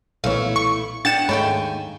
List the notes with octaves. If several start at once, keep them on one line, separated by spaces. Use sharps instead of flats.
B1 A#2 E3 A3 E4 C#5 F5
C#6
B3 D4 F#5 G5 A6 E7
D#2 G#2 A3 C#5 G5 G#5 A#5 B5